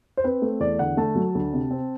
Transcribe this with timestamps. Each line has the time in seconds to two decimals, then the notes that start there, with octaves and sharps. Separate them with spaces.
0.17 C5
0.24 C4 B4
0.42 A3
0.60 E2 D5
0.79 D3 F#5
0.97 A3 A5
1.15 F#3
1.35 D2
1.53 C3
1.71 C4